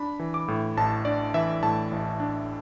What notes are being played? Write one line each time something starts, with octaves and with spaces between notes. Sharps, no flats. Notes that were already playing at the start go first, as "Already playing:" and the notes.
Already playing: D4 B5
E3
D6
A2
A1 A5
D4 D5
E3 E5
A2 A5
A1
D4